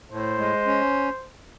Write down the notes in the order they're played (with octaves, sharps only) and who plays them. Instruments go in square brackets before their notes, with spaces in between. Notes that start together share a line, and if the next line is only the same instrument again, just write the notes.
[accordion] A2 [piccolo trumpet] C5
[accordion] G#3
C#4